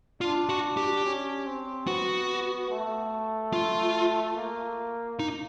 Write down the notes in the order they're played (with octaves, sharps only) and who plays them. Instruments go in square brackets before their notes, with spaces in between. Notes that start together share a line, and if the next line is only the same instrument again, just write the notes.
[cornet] D4 [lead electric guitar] F4
[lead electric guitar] F#4
G4
[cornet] C#4
C4
[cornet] B3 [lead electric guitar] F#4
[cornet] A3
[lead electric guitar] F4
[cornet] A#3
[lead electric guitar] D#4